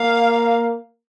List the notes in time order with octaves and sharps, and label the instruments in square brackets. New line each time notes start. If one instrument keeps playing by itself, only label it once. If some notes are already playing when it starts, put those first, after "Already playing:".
Already playing: [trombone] A#3 [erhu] F5